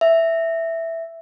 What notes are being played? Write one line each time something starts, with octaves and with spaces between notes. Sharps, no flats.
E5